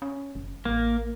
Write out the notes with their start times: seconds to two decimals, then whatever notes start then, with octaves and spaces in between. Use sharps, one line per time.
0.02 C#4
0.35 F#1
0.65 A1 A#3